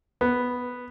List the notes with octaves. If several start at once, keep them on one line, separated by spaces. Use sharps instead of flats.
B3